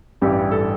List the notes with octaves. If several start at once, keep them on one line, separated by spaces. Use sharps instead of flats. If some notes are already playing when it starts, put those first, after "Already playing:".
A1 G2 E3 G3 G4
A4